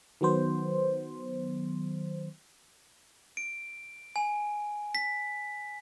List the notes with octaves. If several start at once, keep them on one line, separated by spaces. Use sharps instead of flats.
D#3 F#3 B3 C5
D7
G#5
B6